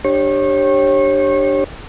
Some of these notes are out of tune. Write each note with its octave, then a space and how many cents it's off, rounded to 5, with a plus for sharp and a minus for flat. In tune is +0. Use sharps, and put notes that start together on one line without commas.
D4 +15 G4 +0 C#5 -30